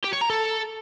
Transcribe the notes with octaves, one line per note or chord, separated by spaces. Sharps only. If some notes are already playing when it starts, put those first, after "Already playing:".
G4
C#5
A#5
A4